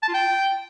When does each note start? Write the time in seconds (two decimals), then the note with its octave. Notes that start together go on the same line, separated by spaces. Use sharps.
0.03 A5
0.09 F4
0.14 G5